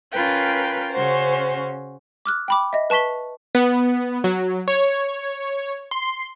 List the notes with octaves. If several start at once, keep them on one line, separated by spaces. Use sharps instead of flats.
C#4 F4 A#4 B4 G5
C#3 C#4 F#4 C5
D6 F6 F#6
G5 B5 D6
D#5 E5
B4 A5 C#6 B6 G7
B3
F#3
C#5
C6